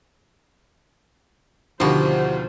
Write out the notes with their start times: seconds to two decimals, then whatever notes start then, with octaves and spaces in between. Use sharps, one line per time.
1.80 D2 B2 D#3 F3 D#4 F4 G4 C5